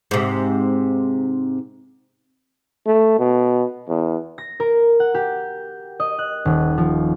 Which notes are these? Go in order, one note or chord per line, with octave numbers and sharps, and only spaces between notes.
G#2 C3
A3
B2
E2
A#6
A#4
F#5
G4
D#5
F#6
D#1
F3